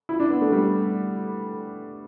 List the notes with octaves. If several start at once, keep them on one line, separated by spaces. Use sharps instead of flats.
E4
D4
B3
A3
G3